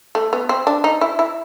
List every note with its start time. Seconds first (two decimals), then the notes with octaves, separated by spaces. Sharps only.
0.15 A3
0.33 B3
0.49 C4
0.67 D4
0.84 D#4
1.01 E4
1.19 E4